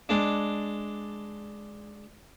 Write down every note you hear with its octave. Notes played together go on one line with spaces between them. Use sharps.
G#3 D4